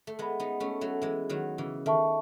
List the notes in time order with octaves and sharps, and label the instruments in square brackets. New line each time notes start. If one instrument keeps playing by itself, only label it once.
[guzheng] A3
[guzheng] G#3 B3 [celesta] A4 E5 B5
[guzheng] B3 D#4
A3 C#4
F#3 A3
E3 G#3
D#3 F#3
C#3 E3
[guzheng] D#3 [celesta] A4 E5 A5 C#6